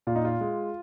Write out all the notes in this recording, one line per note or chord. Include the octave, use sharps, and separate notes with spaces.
A#2 F4
D#4
F4
G#3